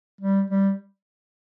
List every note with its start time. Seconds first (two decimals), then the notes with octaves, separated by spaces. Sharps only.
0.21 G3
0.50 G3